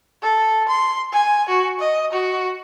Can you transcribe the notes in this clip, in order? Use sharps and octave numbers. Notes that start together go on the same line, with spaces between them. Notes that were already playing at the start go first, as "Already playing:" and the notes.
A4
C6
G#5
F#4
D#5
F#4